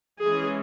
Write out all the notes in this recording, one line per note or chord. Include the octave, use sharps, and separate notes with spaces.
E3 G#3 C#4 G#4